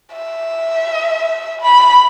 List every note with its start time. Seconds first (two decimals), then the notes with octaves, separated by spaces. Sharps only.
0.12 E5
1.61 B5